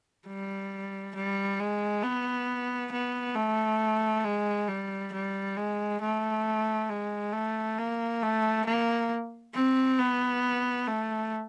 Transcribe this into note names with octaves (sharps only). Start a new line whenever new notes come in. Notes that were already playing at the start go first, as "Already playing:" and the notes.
G3
G3
G#3
B3
B3
A3
G#3
G3
G3
G#3
A3
G#3
A3
A#3
A3
A#3
C4
B3
A3